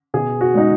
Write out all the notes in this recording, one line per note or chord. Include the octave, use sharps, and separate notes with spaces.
B2 G#4
F#4
G#3 D#4